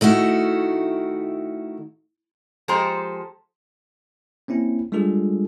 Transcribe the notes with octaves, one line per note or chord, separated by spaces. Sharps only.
D#3 A3 E4 F#4
F3 G#3 G4 A4 C5 A#5
A#3 C4 C#4 E4
G3 G#3 D4 F4 G#4 A4